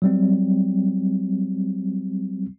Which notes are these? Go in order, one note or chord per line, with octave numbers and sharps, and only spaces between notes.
F#3 G3 C4